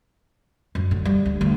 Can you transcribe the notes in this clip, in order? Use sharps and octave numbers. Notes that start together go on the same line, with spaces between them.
F#2
D3
G3
D2
D2